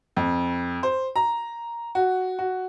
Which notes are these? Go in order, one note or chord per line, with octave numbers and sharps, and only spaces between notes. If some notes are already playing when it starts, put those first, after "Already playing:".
F2
C5
A#5
F#4
F#4